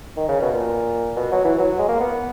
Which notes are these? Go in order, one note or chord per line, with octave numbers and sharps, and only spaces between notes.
D#3
C#3
B2
A#2
B2
F#3
E3
F#3
G#3
A#3
B3